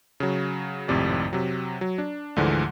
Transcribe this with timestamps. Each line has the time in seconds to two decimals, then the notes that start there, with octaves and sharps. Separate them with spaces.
0.20 C#3 F#3
0.88 G#1 F2 A2 C3 D5
1.33 C3 F#3
1.81 F#3
1.98 D4
2.36 D2 G#2 D3 E3 F3 G#3